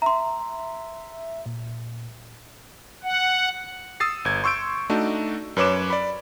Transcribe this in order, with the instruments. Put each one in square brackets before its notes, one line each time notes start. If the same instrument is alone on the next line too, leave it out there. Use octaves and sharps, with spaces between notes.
[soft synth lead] E5 [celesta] A#5 C6
[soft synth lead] A#2
[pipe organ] F#5
[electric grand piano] D#6 E6 A6 C7
G1 G#6
C6 C#6 E6 G6 D7
A3 D4 D#4 F#4
F#2 B4 C#5 D6 E7
D5 B5